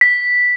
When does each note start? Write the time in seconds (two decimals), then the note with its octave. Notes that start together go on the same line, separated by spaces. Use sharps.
0.01 B6